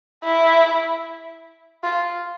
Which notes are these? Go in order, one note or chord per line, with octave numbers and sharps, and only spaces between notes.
E4
F4